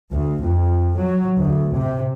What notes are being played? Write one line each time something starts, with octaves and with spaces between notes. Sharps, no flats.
D2
F2
F#3
D2
C3